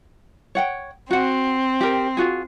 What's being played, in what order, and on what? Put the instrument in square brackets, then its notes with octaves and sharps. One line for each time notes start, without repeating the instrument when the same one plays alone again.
[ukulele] C#5 F#5 G5
[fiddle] C4 [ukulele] F#4 F#5
[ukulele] G4 A#4
F4 F#4 G#4